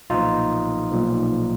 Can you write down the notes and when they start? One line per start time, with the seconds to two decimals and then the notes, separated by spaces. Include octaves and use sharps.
0.10 B1 A#2 F3 D#4 F4
0.91 B1 A#2 F3